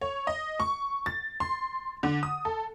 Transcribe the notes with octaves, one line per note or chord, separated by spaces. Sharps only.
C#5
D#5
C#6
A6
C6
D3
D#6
A4